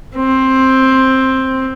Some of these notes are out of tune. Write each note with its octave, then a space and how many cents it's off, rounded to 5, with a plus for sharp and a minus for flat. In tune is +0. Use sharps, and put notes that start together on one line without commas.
C4 +10